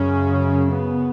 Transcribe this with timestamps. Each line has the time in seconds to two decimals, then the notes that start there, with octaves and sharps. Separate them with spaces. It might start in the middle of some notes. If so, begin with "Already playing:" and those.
Already playing: F#2 C#3 C#4
0.72 B3